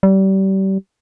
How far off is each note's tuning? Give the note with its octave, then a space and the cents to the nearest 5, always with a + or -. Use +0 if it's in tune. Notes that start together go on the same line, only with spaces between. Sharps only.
G3 -30